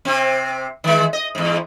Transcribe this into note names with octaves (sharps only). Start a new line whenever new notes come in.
C3 C4
D#3 G#3
D#5
E2 G#2